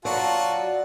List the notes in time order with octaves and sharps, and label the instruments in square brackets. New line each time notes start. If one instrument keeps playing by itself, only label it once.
[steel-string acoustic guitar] F#3 [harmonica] F4 F#4 A5 [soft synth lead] D5